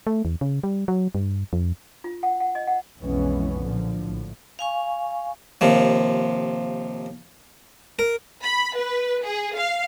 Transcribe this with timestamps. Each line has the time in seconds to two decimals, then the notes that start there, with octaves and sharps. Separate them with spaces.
0.07 A3
0.25 E2
0.41 C#3
0.64 G3
0.88 F#3
1.15 G2
1.53 F2
2.04 F4
2.23 F#5
2.40 F#5
2.55 D#5
2.67 F#5
2.99 B1 F2 E3 G#3 B3 C#4
3.58 A#2 D3 F3
4.02 A#1 A2
4.59 F5 G#5 C#6
5.61 D#2 C3 F3
7.99 A#4
8.42 B5
8.76 B4
9.23 G#4
9.56 F5